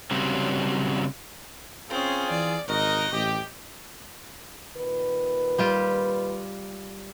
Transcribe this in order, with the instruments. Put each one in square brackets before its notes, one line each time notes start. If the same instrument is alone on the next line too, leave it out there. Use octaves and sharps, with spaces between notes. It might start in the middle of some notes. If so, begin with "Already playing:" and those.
[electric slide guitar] C#3 F#3 G3 C4
[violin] C4 C#4 [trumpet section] F4 G#4
[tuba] E3 [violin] D5
[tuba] G#1 [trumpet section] D#4 F#4 A#4 [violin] D#5
[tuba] A1 [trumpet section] G4
[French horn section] A#2 D#3 B4
[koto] G3 F4 G4